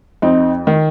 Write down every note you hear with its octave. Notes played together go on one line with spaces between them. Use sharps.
F2 C4 D#4
D#3